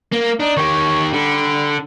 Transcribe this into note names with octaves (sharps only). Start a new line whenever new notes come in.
A#3
D4 D#4
D#3 G4 C#5
D3 G3